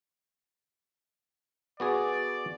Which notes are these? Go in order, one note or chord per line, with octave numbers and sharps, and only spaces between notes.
B3 F#4 G#4 D5